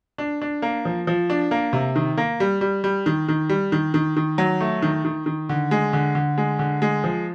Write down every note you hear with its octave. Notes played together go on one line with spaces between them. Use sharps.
D4
D4
A#3
F3
F3
D4
A#3
C3
D#3
A#3
G3
G3
G3
D#3
D#3
G3
D#3
D#3
D#3
F#3
A3
D#3
D#3
D#3
D3
G#3
D3
D3
G#3
D3
G#3
F3